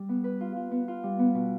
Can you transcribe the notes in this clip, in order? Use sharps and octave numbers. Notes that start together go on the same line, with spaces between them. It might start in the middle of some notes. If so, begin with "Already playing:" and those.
Already playing: G3
B3
B4
F4
F4
B3
F4
G3
B3
B2